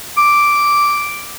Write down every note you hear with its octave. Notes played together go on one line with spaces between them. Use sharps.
D6